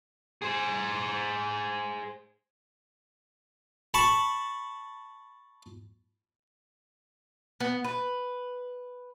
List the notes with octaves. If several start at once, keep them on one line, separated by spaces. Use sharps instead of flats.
G#4 C5
A5 B5 C#6
B3
B4